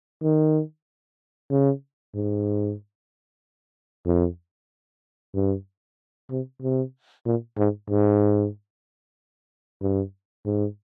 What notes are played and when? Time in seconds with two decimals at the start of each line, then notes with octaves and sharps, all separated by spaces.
0.23 D#3
1.51 C#3
2.15 G#2
4.06 F2
5.35 G2
6.30 C3
6.62 C3
7.25 A#2
7.58 G#2
7.90 G#2
9.82 G2
10.45 G#2